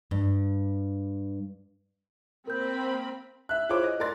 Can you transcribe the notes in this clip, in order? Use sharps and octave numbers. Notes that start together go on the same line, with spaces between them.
G2
A#3 C4 A#4 B5 G6
E5 F#6
E4 F4 G#4 C5 C#5 D6
D#5
A#4 D5 C6 A6